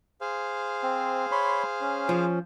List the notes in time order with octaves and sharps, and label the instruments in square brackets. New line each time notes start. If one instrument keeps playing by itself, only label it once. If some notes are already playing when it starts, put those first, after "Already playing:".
[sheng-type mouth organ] G#4 C5 F5
[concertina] C4
C#5 B5 C6
C#4
[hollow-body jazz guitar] F3